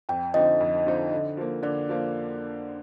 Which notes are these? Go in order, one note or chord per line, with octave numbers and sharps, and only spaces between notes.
F2 G5
D3 F3 C4 D#4 D#5
F2
D3 F3 C4 D#4
D3
F3 A#3
D3 D5
F3 A#3